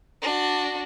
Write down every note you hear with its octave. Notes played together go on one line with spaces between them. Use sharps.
D4 F#4